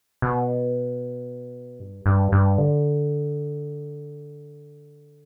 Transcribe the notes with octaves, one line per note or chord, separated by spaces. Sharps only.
B2
G2
G2
G2
D3